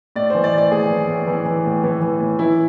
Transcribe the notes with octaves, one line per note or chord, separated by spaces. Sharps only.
A2 D5
E3 C5
D5
A2
D5
A2 G#4
E3
A2
E3
E3
A2
E3
E3
A2
E3 E4